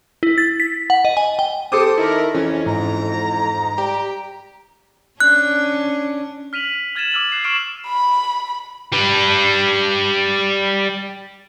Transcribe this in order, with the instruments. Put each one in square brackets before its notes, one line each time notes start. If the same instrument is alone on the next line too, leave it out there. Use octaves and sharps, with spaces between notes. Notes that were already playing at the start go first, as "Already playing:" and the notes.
[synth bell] E4
A6
B6
F#5
D#5
G#5
G5
[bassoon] C4 [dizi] G4 [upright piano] A4 C5 D6 [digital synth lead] D#6
[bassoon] D#3 [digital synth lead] E4 [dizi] A#4
[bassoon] F2 [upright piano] E3 [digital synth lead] C#4 [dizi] D#5
[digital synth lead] G#2 [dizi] A#5
[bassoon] G3 [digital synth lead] G4
[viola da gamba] C#4 D4 [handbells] F#6
[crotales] F6 B6 D#7 F7 F#7
F6 G#6 A6 D#7 E7 F#7
D6 E6 F6 A6 F#7
F#6 C7
C#6 F6 D7 E7 F#7
[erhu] B5
[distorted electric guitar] G3 B4